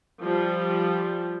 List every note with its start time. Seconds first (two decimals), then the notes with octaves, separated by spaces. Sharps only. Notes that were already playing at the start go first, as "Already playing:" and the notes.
0.23 F3 G3